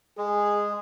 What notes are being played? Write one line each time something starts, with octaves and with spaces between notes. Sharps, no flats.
G#3 G#4